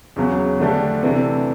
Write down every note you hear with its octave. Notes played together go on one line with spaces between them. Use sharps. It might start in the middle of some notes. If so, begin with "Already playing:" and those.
E2 C#3 F#3
D3 F3 A3 D4 G4
C3 E3 A3 D4